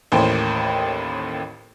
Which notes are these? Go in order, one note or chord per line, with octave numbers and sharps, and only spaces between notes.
A1 D#2 A2 A#3 C5 G5